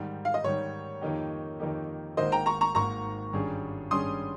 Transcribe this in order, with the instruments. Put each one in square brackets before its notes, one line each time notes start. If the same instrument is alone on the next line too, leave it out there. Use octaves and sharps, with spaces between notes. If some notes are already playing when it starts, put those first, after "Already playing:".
Already playing: [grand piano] G#2 D#3 G3
[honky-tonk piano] F5
D#5
[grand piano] G#2 D#3 G3 [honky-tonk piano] C#5
[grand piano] F2 D#3 A#3 D#4 G4
F2 D#3 A#3 D#4 G4
[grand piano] G#1 G#2 D#3 A#3 [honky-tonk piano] C5 D#5
[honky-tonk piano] G5 A#5
A#5 C#6
A#5 C#6
[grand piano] G#1 G#2 D#3 A#3 [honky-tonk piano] A#5 C#6
[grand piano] G#1 G2 G3 C#4 G#4
[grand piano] G#1 G2 G3 C#4 G#4 [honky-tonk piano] C6 D#6